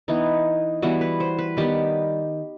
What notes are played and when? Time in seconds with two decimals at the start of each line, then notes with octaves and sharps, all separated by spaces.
0.08 E3 B3 D#4
0.82 E3 G3 B3 F#4
1.01 B4
1.20 C5
1.38 B4
1.57 D#3 G3 B3 G4